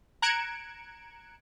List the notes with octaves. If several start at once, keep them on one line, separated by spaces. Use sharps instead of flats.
A#5 F#6 G#6 C#7 D7 E7